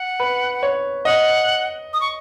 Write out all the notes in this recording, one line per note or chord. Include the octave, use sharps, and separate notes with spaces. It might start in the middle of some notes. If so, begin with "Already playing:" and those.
Already playing: F#5
B4
C#5
D#5 F#5
D#6
C#6